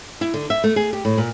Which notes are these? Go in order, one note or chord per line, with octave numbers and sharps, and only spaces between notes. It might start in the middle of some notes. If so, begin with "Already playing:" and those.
E4
D3
E5
A3
G#4
G4
A2
A#2